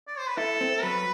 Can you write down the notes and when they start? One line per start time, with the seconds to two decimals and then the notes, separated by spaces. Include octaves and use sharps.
0.08 D5
0.19 C5
0.28 B4
0.37 E4 A4
0.61 C4
0.82 F#3 B4